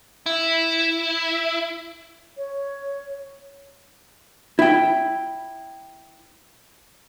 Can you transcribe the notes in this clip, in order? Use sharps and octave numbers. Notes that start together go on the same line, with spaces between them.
E4
C#5
E4 G5